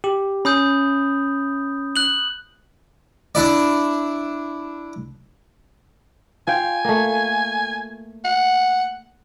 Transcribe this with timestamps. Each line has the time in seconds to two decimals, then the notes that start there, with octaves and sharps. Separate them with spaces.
0.04 G4
0.45 C#4 B5 D#6 G6
1.96 F#6 F#7
3.35 D4 E4 D5
6.47 F4 F5 G5 G#5
6.85 A3 A#3
8.25 F#5